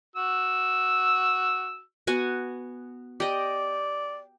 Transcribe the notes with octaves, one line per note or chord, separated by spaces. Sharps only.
F#4 E6
B3 F#4 G#5
G4 D5 D#5